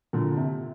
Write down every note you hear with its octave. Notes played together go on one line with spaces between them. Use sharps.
A#2 D3
C3